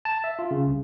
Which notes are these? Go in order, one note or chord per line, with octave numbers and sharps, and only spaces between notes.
A5
E5
F4
C#3
C2